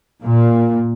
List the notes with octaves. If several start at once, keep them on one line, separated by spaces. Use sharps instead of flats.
A#2